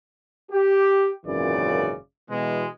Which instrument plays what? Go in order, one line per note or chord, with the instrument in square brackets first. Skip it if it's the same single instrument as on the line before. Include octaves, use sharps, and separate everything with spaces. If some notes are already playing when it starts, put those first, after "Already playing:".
[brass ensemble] G4
G#1 F#2 A#2 C#3 E3 D5
B2 E3 G#3